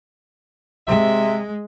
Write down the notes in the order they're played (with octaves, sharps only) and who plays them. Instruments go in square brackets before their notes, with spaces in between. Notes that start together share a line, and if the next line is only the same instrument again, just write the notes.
[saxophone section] C3 E5 [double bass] G#3